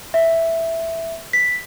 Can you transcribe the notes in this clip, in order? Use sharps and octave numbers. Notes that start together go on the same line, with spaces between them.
E5
B6